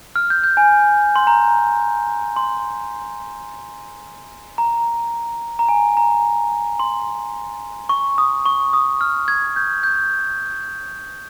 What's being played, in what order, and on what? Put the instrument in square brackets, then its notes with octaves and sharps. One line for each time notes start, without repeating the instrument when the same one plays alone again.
[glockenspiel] F6
G6
G6
G#5
C6
A#5
C6
A#5
A#5
G#5
A#5
C6
C#6
D#6
C#6
D#6
F6
G#6
G6
G6